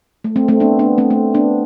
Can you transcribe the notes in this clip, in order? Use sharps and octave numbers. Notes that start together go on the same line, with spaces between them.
A3
A3 C4
A3 C4
B3 D4
B3 D4
A3 C4
A3
B3 D4